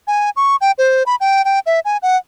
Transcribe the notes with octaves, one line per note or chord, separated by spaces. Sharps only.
G#5
C#6
G5
C5
B5
G5
G5
E5
G#5
F#5